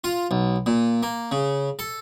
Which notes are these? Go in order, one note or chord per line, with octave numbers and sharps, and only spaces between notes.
F4
B1
A#2
A#3
C#3
A4